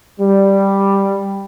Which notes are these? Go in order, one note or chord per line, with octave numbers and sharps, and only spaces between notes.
G3